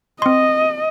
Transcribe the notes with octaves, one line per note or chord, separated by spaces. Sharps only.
C4 D#5 C6